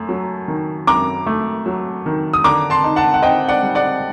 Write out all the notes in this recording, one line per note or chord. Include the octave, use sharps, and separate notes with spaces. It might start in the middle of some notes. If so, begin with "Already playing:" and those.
Already playing: F#2 A3
F#3
D#3
F#2 A#5 D6
A3
F#3
D#3
D#6
D3 A#5 D6
A5 C6
D#4
F#5 A5
F#5
C4 D#5 G5
D5 F#5
G3
D5 F#5